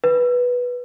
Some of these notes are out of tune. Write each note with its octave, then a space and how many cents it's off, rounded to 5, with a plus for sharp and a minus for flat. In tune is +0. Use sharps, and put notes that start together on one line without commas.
B4 -10